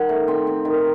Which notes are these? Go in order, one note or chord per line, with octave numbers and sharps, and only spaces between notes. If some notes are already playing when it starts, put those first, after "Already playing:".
Already playing: D#3 F#5
A3
C4
C4
D#3